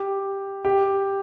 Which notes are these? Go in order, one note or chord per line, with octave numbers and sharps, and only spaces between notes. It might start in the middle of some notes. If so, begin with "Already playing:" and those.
Already playing: G4
G4